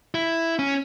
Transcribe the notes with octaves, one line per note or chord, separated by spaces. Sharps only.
E4
C#4